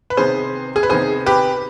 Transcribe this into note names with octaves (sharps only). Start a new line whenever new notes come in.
B4
C3 D#3 B3 G#4 C5
G#4
B4
C3 D#3 B3 G#4 C5
G4 B4